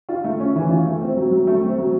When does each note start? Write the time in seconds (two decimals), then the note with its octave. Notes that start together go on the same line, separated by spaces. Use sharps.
0.09 F4
0.24 A3
0.40 C#4
0.55 E3
0.70 F4
0.85 A3
1.01 C4
1.16 F#3
1.32 F#3
1.47 A3
1.62 C4
1.78 F#3